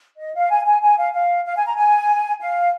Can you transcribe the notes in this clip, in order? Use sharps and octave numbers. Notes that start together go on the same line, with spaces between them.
D#5
F5
G#5
G#5
G#5
F5
F5
F5
G#5
A#5
G#5
F5